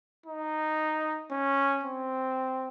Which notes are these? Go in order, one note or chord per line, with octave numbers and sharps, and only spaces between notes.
D#4
C#4
C4